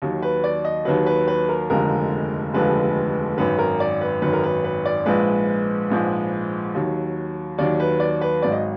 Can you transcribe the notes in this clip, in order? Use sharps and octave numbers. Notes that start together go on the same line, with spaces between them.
D#2 D#3 F#3
B4
D5
D#5
D#2 D#3 F#3 B4
B4
B4
A#4
F1 D#2 D3 F3 G#3 A#4
F1 D#2 D3 F3 G#3 B4
G#1 F#2 D#3 B4
A#4
D5
B4
G#1 F#2 D#3 B4
A#4
B4
B4
D5
A#1 G#2 F3 G#3 B4
A#1 G#2 F3 G#3
D#2 D#3 F#3
D#2 D#3 F#3 D5
B4
D5
B4
G#1 G#2 F#3 D5
D#5